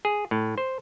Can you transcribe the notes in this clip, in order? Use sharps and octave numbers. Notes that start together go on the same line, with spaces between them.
G#4
A2
C5